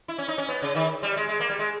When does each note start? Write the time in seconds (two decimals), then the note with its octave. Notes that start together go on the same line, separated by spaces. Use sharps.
0.08 E4
0.18 C#4
0.28 D#4
0.38 C#4
0.48 B3
0.62 C#3
0.75 D#3
1.03 G3
1.16 G#3
1.29 G#3
1.40 A#3
1.49 G3
1.59 G#3